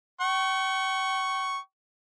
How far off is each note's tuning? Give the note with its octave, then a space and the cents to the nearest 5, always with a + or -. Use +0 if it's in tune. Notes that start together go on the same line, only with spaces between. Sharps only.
G5 -40 C#6 +0